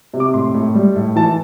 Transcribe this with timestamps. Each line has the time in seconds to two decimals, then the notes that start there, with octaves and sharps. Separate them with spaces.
0.14 C3
0.20 D6
0.34 A2 C6
0.54 A2
0.75 G3
0.96 A2
1.16 E3 A5